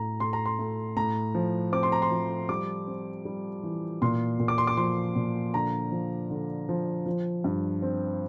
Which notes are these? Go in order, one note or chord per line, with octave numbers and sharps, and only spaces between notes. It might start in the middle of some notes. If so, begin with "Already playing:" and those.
Already playing: A2 A#5
A2 C6
A#5
C6
A3
A2 A#5
F3
C4 D6
C6
A#5
C6
F3
G3 D6
C4
G3
E3
A#2 C6
A#2
D6
C6
D6
F3 C6
A#2
D3 A#5
F3
D3
F3
F3
G2
C4